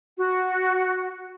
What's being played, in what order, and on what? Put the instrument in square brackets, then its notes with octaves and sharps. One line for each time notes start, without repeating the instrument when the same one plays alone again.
[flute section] F#4